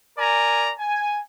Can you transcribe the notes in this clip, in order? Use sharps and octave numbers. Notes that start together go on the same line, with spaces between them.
A#4 D5 G#5 A#5
G#5